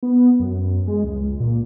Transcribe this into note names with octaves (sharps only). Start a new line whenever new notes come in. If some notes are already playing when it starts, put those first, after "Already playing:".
B3
F#2
G#3
C#2
A#2